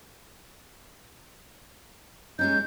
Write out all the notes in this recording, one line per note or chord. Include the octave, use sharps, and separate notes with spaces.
G#3 C#4 D#4 G6